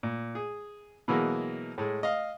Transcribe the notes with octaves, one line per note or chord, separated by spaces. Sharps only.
A#2
G#4
B2 E3 F#3 G#3 A#3
A2 G#3
D#5 F5